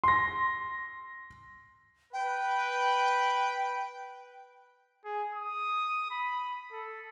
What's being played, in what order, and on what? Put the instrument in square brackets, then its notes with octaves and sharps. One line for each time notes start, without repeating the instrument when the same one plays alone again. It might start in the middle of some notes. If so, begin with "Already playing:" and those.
[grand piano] C6 A#6
[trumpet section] B4 [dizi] G5
[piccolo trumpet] G#4
D#6
B5
A4